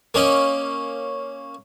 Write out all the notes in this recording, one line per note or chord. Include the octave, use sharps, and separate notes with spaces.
A#3 C#4 D#5